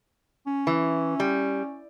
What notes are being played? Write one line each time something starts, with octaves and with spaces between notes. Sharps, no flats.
C#4
E3
G3